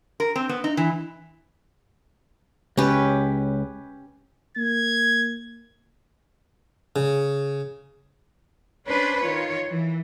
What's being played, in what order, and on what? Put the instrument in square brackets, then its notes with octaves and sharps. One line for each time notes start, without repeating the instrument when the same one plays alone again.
[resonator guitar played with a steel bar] A#4
C4
B3
D#4
E3
[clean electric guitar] C#2 [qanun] C#4 G4 B4
[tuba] A#3 [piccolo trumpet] G#6
[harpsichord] C#3
[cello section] C#4 D4 B4 C5
D#3 F4 C#5
E3